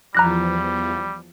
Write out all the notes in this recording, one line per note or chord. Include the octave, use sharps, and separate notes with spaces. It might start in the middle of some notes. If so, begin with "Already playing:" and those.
E2 F3 G3 A#5 F#6 A#6